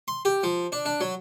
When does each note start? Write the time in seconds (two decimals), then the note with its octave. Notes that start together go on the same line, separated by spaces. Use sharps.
0.08 C6
0.25 G4
0.43 F3
0.72 D4
0.86 D4
1.01 F#3